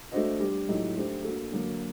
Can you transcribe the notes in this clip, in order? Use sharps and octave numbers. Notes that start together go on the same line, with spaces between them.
A3 D4 F#4 C5 D#5
G3 D4 G4
A2 F#3 A3 D#4 G4
A3 D4 G4 C5
A#3 D4 F#4 A4
D3 F#3 A#3